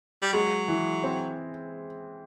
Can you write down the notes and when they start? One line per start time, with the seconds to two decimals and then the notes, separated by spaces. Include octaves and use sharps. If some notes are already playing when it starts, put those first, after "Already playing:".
0.22 G3
0.33 F#3 G#3
0.68 E3
1.04 C4